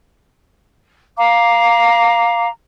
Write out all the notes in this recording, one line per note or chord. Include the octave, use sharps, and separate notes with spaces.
F5 A#5 D6